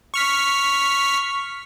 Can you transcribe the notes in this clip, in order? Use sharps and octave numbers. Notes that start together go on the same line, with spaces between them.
C#6 F6 B6